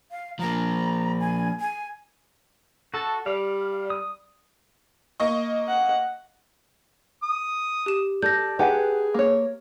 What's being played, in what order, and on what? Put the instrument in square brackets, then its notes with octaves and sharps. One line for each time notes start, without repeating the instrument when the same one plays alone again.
[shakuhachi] F5
[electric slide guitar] F3 A#3 [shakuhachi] A#5
[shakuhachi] G#5
G#5
[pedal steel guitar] F#4 A5 [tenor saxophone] A4
[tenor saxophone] G3 [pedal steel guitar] F5
[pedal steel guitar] D#6
[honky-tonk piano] A#3 D#5 C#6
[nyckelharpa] F#5
[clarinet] D#6
[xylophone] G4 E7
[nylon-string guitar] A4 [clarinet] D5 [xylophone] G6 A#6
[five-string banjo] G4 [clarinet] G#4 [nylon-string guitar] B4 F#5 G#5
[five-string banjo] A#3 C#5